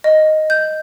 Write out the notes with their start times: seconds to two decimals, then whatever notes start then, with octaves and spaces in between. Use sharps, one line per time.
0.04 D#5
0.50 G6